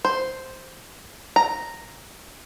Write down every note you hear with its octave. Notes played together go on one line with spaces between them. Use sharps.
C5
A#5